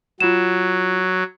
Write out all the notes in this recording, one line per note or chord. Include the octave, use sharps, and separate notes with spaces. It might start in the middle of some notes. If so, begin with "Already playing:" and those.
F#3 F4 E7